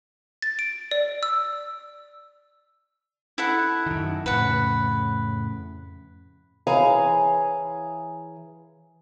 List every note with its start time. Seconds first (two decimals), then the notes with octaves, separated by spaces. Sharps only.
0.42 A6
0.59 D7
0.91 D5
1.23 E6
3.38 E4 A4 F#5
3.86 F#2 D#3
4.26 F2 A2 C#3 B4 F#5
6.67 E3 G#4 C#5 F5 G#5 A#5